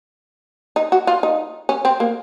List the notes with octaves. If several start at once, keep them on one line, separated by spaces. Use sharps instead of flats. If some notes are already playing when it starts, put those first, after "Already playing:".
D#4
F#4
F4
D#4
C#4
C4
A#3